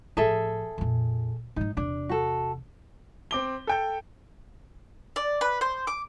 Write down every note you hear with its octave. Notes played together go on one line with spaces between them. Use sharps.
A2 F3 G#4 A4 E5
F2 A#2
G#2 F#3 D#4
E2 C3 D4
F#4 A4
C4 D6 G7
A4 G5 G6
D5
B4
C5
D6